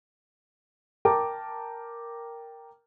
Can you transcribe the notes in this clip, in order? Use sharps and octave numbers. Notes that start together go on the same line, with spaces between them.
A#4 G5 A5 A#5 D6